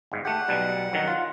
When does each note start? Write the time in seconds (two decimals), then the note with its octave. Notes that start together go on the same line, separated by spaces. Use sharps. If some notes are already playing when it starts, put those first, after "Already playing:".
0.12 G1 G#2
0.25 A3 G4 F#5
0.48 B1 B2 G3
0.93 F#2 D#3 F#3
1.08 F4